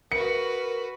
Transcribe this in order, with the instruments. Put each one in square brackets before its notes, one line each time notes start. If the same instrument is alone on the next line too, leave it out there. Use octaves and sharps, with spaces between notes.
[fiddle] F#4 B4 [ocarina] A#4 [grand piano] C#7